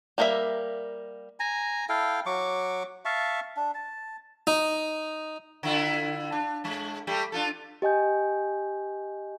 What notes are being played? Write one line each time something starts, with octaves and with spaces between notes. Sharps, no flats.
G3 A#3 A#4 D#5 E5
G#5 A#5
E4 A4 F5 G5
F#3 C#6 D6
E5 F5 A5 C#6
D4
A5
D#4
D3 E4 F4
D4
A2 G#3
G3 A3 G4
D4 F4 A4
G4 D#5 G#5 G6